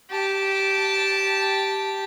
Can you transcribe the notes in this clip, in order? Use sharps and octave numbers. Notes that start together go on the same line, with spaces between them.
G4 A5